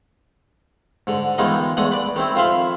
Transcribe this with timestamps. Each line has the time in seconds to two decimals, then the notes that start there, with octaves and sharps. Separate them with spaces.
1.07 G#2 D3
1.38 D#3 E3 G#3 B3 D#4 F4
1.77 E2 G#3 A3 F#5 D#6
1.92 B4 D5
2.16 D#3 C4 E4
2.35 F2 F4 C5 E5 F5 B5